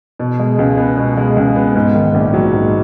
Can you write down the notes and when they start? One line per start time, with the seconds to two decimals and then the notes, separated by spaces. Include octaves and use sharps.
0.19 B2
0.40 G#3
0.59 C#2
0.78 B3
0.97 B2
1.17 G#3
1.37 C#2
1.56 B3
1.76 G#2
1.95 D#3
2.14 A#1
2.34 F#3
2.53 G#2